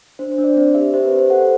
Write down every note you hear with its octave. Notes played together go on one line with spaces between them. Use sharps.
D4 C5
C5
D4
D5
C4 D5
G4 E5
G4 C5
B4
G4
C5
A4 F#5